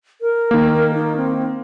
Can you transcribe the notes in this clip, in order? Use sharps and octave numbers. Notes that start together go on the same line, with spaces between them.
A#4
D#3 A#3
D#4
C4